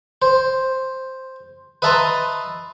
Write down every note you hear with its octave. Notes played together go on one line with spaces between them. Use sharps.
C5
B4 D#5 E5 A5 A#5 C6